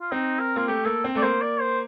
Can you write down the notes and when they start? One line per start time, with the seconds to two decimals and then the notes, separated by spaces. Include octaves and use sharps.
0.01 F4
0.12 C4 D#4
0.40 A#4
0.56 A#3 F4
0.68 A3 G4
0.85 A#3 A4
1.04 C4
1.15 A3 D5
1.22 A#3 C5
1.42 D5
1.61 C5